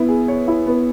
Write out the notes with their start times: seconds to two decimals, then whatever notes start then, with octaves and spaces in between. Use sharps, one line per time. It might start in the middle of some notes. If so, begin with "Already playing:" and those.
Already playing: B3 E4
0.09 G#4
0.28 C#5
0.48 E4
0.66 B3